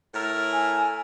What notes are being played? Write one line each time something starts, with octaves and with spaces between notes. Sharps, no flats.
A2 A#4 E5
G#5